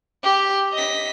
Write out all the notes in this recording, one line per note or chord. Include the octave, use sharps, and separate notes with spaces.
G4
D#5 B6